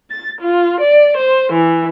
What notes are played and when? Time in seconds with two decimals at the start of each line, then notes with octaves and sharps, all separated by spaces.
0.10 A6
0.40 F4
0.80 D5
1.16 C5
1.52 E3